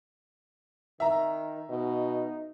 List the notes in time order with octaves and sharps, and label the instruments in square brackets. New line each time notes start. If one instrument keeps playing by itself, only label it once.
[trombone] D#3 [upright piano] E5 A#5
[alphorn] B2 [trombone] D#4